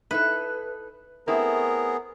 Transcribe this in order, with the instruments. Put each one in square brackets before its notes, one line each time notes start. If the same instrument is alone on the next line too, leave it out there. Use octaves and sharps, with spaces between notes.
[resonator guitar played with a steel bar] D#4 E4 A4 [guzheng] B4
[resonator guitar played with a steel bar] A3 C4 E4 [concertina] B3 G#4 [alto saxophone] A#4